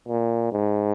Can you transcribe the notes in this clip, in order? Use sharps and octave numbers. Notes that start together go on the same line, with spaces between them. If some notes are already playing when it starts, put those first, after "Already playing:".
A#2
G#2